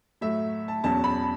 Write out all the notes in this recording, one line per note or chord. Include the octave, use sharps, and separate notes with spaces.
A2 F#3 A3 E5
A5
E2 B2 F#3 C#4 A5
B5